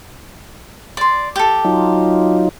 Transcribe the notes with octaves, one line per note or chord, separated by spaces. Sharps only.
D5 C6
G4 A4
F#3 D#4 F4